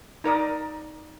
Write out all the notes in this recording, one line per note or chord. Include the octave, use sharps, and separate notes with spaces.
D#4 A#4 D5 D#6